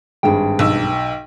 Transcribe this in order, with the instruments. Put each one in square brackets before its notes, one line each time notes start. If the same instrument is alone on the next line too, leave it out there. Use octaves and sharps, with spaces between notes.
[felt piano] G#1 G2 G#4 [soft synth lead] G5
[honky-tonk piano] B1 E6